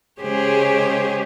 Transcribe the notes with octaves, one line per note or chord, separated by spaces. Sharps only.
C#3 G#3 G4 G#4 C5 C#5